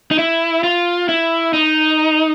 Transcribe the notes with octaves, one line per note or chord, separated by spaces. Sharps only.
D#4
E4
F4
E4
D#4